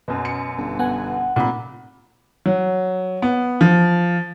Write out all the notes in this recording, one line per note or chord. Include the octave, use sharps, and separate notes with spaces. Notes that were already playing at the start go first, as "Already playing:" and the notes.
F#2 B2
C#7
G1
B3 F#5 G#5
F1 A#2 F#5 B5
F#3
B3
F3